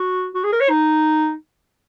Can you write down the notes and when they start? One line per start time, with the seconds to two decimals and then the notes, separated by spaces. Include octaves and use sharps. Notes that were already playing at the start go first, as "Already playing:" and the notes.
Already playing: F#4
0.35 F#4
0.44 G#4
0.52 A#4
0.61 C#5
0.70 D#4